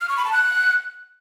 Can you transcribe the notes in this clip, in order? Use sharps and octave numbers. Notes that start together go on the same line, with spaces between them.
F6
C#6
B5
A5
F#6